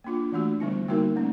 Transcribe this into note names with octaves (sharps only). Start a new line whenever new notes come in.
A#3 D4 F4
E3 A3 D4 F#4
D3 G3 B3 E4
G3 A#3 D#4 F#4 A#4
A3 C#4